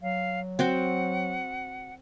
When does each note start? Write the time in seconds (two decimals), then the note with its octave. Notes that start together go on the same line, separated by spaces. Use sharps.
0.03 F#3 F5
0.59 C4 F#4 F#5 G5